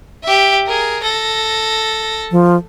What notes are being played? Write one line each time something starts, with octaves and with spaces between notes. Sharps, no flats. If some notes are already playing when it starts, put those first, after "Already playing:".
G4 E5
G#4 A#4
A4 A#6
F3